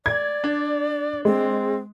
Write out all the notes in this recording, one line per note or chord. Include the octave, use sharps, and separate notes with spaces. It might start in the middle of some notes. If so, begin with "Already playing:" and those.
D5 G#6
D4
G#3 C4